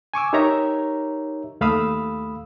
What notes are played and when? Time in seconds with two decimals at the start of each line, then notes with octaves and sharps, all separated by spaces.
0.14 G#5 C#6 D6 E6
0.33 D#4 G4 A#4 C#5 E5 A#5
1.61 D#2 A3 F5 B5 D#6 E6